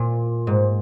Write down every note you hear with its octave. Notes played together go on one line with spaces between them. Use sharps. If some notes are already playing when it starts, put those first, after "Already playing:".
Already playing: A#2
G#2